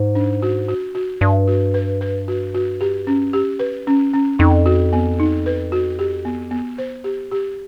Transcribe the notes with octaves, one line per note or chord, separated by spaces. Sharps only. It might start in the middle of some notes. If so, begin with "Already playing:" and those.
Already playing: G#2
D4
F#4
F#4
F#4
G2 D5
F#4
B4
B4
F#4
F#4
G4
C#4
G4
B4
C#4
C#4
F2 D#4
F#4
B3
D#4
B4
F#4
G4
B3
B3
C5
G4
G4